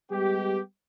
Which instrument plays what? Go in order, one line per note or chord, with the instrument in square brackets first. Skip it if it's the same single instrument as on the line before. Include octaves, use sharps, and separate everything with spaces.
[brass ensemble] G3 G#3 B3 G4